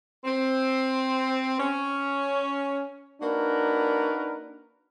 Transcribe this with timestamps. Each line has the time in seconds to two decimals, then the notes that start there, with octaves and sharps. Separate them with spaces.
0.23 C4
1.58 C#4
3.21 A#3 D4 D#4 F#4 A#4 B4